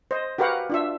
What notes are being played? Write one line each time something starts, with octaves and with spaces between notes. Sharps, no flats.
C5 D#5
F#4 G4 A#4 B4 F5 F#5
D4 F4 E5